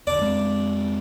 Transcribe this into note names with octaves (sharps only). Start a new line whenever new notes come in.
E2 D3 D4 D5 D6
F2 G#3 C4